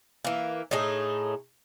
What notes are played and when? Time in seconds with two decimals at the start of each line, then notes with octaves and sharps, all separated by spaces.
0.25 E3 A#3
0.71 A2 A3 D#4 G#4